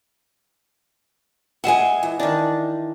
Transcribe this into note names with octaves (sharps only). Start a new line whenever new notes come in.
G#3 E5 F#5 G#5 C6
E3
D#3 D4